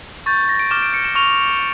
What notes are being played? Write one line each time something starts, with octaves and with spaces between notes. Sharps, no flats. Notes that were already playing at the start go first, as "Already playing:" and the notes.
C#6 G6 A6
A#6
D7
D6 F6 E7
D7
C#7
E7
C#6 F6 F7